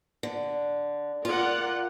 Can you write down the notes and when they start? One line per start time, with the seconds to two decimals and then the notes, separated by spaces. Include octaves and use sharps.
0.23 D3
1.25 F4 A#4 D5 F#5